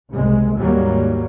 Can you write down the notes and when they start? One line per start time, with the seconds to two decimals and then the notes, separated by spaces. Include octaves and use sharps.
0.10 F#1 C2 G#3
0.57 D#2 G#2 F#3 G3 A#3